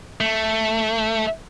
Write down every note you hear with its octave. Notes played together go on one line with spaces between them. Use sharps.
A3